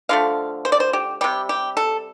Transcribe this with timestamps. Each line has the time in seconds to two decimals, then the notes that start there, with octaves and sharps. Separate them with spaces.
0.09 D3 F3 A3 F5
0.65 C5
0.72 D5
0.80 C5
0.93 G4
1.21 C3 G3 G4
1.49 G4
1.77 A4